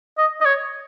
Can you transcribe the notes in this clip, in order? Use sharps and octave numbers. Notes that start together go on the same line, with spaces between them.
D#5
D#5
C#5